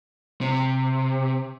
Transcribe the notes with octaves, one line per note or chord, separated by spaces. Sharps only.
C3